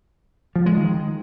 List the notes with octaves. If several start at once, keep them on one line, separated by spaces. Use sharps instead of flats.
F3
G#3
D#3